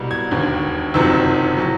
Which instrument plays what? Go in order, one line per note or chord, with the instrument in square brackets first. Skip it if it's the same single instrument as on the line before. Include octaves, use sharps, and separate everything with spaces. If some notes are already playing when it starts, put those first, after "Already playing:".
Already playing: [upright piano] C2 B2 G3
G#6
E1 D#2 D3
F#1 F2 C3 D#3 F#3 E6
A2 F#3